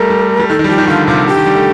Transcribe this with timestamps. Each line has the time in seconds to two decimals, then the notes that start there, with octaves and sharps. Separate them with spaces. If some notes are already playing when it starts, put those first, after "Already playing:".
Already playing: G3 A3 A#4
0.10 G3
0.29 A3
0.39 G3
0.48 D#3 A4
0.59 D#3
0.64 G3
0.69 F3 G4
0.78 D#3
0.88 D3 F4
1.07 C3 F4
1.27 D3 G4
1.36 D#3
1.46 G3
1.55 A3